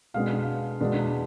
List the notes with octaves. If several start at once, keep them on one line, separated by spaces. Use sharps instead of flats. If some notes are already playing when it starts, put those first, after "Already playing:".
B2 G#3 B3 D4 F5
E2 B2 G#3 B3 D4